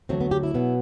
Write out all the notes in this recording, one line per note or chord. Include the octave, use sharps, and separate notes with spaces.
D2 D3 F#3 A3 C4
B3
G4
E4
B2 F#3 B3